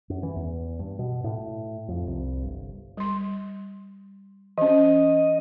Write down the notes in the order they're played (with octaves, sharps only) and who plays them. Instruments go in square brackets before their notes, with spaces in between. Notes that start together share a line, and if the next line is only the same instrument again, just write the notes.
[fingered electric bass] F#2
E3
E2
G2
B2
A2
F2
C2
G1
[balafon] G3 C6
[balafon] E3 C#4 [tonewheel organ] D#5